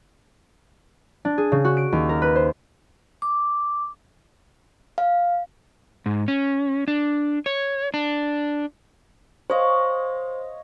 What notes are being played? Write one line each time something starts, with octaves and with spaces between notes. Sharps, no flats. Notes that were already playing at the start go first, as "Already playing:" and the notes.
D4
G#4
C#3
F#4
D7
D#2
A#4
B4
C5
D6
F5
G#2
C#4
D4
C#5
D4
C5 C#5 D#5 F5